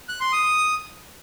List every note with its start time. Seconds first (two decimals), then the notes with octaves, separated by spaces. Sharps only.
0.09 F#6
0.20 C6
0.32 D#6